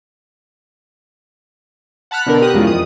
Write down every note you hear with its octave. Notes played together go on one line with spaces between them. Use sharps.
F#5 A5 B5 F6 F#6
B2 D3 A#4
G4 D#6 F#6
E2 C#3 G#3 F4
F2 D#6